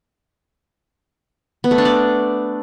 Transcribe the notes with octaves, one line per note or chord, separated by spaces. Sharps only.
B3
A3
D4
D5